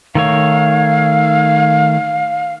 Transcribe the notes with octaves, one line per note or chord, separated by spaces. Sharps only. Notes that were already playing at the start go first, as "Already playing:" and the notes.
D#3 A3 C#5 F5